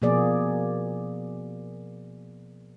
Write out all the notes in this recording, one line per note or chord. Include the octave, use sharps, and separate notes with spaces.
B2 F3 A#3 G#4 D5